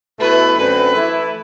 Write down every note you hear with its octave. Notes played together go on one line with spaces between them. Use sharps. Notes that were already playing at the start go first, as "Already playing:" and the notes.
B2 A3 E4 B4
F#2 D3 A3 C4 B4
E3 A3 E4